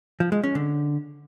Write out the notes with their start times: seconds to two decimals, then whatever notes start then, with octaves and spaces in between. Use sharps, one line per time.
0.20 F3
0.32 G#3
0.44 C#4
0.55 D3